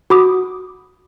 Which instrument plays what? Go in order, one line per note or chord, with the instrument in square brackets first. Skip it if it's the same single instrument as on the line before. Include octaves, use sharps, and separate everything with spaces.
[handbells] F#4 B5 D6 D#6